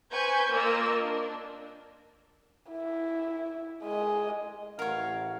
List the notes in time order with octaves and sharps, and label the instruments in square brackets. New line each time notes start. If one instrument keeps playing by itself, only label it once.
[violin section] B4 C5 G#5 C#6 G6 G#6
A#3 F4 A#4 D#5 E6
D4
[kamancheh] E4
G#3 D#5
[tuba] A1 [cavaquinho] A#4 C#5 [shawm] F5 [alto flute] F#5